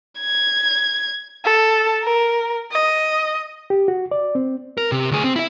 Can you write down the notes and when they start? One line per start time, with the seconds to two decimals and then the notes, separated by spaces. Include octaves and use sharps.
0.20 G#6
1.44 A4
2.03 A#4
2.72 D#5
3.70 G4
3.88 F#4
4.11 D5
4.35 C4
4.78 A#4
4.92 C3
5.11 D2 G#4
5.24 C4
5.36 E4 E5